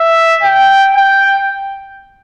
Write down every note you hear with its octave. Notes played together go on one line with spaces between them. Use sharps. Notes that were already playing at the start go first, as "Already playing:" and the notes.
Already playing: E5
G5
G5